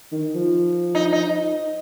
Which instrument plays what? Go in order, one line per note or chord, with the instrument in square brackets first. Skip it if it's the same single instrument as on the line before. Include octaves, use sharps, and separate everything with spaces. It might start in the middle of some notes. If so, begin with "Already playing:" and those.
[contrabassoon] D#3
F3
[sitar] D#4
D#4